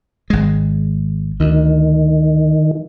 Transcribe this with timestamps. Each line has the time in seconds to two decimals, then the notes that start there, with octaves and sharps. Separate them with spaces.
0.30 G#1 G#3
1.40 D2 D#3